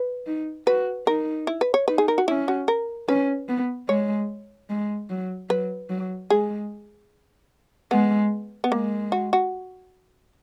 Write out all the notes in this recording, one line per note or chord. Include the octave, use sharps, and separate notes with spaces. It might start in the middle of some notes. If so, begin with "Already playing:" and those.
Already playing: B4
D#4
F#4 B4
D#4 A#4
E4
B4
C#5
D#4 B4
G#4
A#4
F#4
C#4 E4
F#4
A#4
C#4 B4
B3
G#3 C#5
G#3
F#3
F#3 B4
F#3
G#3 G#4
G#3 B3
B3
G#3 A#3
F#4
F#4